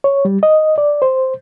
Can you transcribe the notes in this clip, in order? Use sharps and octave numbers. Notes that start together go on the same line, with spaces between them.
C#5
G3
D#5
D5
C5